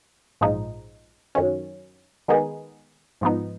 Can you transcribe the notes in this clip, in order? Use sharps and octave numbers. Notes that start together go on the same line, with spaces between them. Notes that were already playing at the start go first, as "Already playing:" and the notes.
A#1 G#2 F3 G#3 D#4
F#2 D#3 F#3 C#4
D#3 G#3 B3 D#4 G#4
G#2 F3 B3 D#4